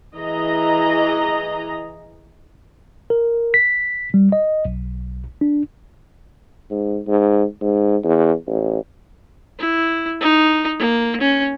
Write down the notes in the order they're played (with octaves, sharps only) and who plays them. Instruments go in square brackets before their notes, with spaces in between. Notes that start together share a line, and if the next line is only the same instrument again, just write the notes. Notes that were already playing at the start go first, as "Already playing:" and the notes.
[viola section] E3 G#4 D#5 A#5
[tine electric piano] A#4
B6
G3
D#5
B1
D4
[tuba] G#2
G#2
G#2
E2
A1
[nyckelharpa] E4
D#4
A#3
C#4